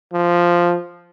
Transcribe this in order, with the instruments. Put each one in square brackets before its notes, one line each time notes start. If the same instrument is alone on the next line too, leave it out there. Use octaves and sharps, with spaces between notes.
[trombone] F3